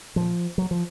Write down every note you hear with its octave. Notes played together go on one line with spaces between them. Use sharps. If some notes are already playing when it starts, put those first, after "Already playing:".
A#2 F3
F#3
F3